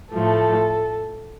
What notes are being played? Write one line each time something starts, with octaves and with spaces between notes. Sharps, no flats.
A2 F3 A3 A4